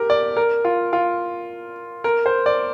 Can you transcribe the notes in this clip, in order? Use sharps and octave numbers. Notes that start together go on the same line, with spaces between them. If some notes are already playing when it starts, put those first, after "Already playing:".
Already playing: G4 A#4
D5
A#4
F4
F4
A#4
C5
D5